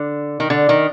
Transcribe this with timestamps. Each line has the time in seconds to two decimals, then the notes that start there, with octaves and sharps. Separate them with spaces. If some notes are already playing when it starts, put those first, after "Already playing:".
Already playing: D3
0.40 D#3
0.50 D3
0.69 D#3